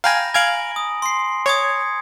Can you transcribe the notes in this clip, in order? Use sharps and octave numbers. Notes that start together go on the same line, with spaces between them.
F5 G5 G#5 A#5 B5 A#6
F5 G#5 F6 G#6 D7 F#7
D#6
C6 C7
C#5 D#6 G#6 C#7